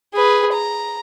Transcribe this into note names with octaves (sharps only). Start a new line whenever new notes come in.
G#4 B4
A#5